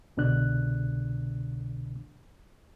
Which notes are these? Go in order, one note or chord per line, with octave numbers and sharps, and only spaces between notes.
C2 B2 D3 D4 F#6